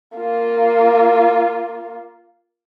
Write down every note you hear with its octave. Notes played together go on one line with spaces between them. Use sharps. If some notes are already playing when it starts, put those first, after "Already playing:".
A#3 F4